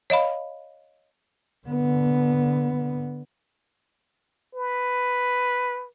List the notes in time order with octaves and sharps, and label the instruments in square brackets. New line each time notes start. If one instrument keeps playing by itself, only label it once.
[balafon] C#5 D#5 F5 B5
[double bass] D3 B3
[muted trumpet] B4